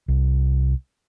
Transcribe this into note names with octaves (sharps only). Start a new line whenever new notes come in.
C2